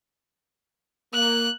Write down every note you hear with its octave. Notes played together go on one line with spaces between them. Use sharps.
A#3 F#6